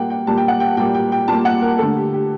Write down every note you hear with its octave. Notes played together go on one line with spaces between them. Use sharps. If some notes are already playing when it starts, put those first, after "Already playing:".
Already playing: A#2 G3 A#3 F#5 G5
G5
A#2 G3 A#3 A5
G5
F#5
G5
A#2 G3 A#3 G5
G5
G5
A#2 G3 A#3 A5
F#5
A#4
D3 A3 A4
G4
G4